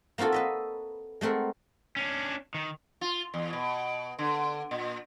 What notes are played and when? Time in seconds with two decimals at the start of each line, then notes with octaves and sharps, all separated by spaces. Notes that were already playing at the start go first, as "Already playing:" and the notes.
0.18 A#3 C4 F4 F#4 A4
0.32 B4 D#5 E5
1.21 G#3 A3 C4 A#4 F#5
1.96 C#4 D4
2.54 D#3
3.01 F4
3.34 E2
3.53 B2
4.19 D3
4.71 A#2